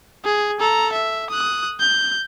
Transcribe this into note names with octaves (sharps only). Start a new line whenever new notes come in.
G#4
A4 A#5
E5
D#6 F#6
G6